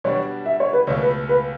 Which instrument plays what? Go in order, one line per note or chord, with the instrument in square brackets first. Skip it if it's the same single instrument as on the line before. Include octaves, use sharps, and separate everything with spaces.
[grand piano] B2 G3 D4 F#4 [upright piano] C#5
[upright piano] E5
C#5
B4
[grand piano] C#2 B2 A3 [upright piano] C#5
[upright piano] B4
B4